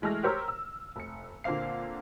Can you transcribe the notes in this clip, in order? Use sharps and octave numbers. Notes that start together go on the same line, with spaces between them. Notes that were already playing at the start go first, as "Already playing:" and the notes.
E3 G#3 A3 F6 A#6
G4 A#4 C5 C#5 A#5 E6
E6
F1 C#7
A#2 D3 A#3 C4 F5 C7